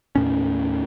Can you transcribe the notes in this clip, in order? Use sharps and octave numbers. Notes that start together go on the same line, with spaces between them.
D#2 A2 C#4